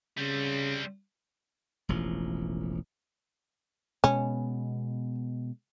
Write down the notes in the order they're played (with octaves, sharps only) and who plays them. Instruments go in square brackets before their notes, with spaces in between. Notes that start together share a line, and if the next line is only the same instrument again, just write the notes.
[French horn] C#3 [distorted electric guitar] G3 C4
[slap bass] E1 A1 F3
[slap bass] B2 G#3 B3 [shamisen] C#4